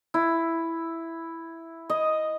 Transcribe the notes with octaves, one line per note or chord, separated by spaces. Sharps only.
E4
D#5